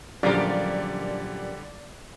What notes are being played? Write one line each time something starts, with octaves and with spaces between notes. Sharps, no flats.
A#1 F#2 D3 G3 F4 G4 A#4 D5